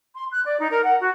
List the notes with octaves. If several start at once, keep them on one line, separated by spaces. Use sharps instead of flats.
C6
F#6
D5
D#4
A#4
F#5
F#4